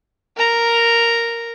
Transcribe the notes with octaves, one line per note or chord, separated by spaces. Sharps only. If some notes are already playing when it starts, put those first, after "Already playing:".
A#4 A#5